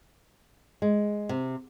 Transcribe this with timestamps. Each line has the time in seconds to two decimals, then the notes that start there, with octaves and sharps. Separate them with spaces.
0.82 G#3
1.29 C3